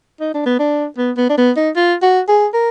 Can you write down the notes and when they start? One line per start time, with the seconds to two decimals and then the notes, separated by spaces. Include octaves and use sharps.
0.20 D#4
0.34 D4
0.46 B3
0.59 D4
0.98 B3
1.17 B3
1.30 D4
1.38 B3
1.56 D#4
1.76 F4
2.02 F#4
2.28 G#4
2.54 A#4